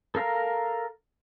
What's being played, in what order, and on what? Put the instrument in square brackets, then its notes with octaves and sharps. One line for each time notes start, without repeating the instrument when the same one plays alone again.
[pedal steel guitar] A4 A#4 F5 A#5